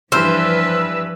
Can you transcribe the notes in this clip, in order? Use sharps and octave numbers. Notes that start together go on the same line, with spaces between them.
G2 E3 F3 D4 B4 C5 E6 F6